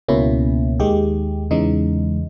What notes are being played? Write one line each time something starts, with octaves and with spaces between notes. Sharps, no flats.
C#2 B2 A#3 C#4 E4
D#2 D#3 G#3 G4
E2 C#3 E3 G#3 D#4